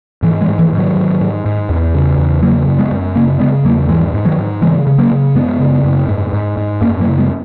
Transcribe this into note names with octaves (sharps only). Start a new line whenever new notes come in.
G#2 E3
E3 G#3
G#2
E3
G#2
D#3 F#3
G#2
G#2
G#2
E2
C#3
E2
C#3 F#3 A#3
F#2
G#3 B3
F#2
C#3 A#3 C#4
C#3 G#3 B3
E2 F#3 A#3
G#2 E3 G#3
G#2
D#3 F#3
G#2
C#3 E3 G#3
C#3
F#3 A#3
C#3
F#2 G#3 B3
C#3
F#2
G#2
G#2
G#2
F#2 A#3 C#4
F#3 A#3
C#3
G#3 B3